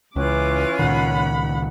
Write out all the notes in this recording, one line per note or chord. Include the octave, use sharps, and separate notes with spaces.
C#2 E3 C#4 F4 D6 F#6
C#2 A#2 D#3 F#5 B5